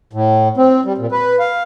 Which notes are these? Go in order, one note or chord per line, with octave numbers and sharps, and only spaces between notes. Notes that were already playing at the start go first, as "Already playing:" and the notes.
A2
C4
G3
A#2
B4
F5